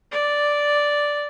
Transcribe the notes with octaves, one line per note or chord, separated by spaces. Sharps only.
D5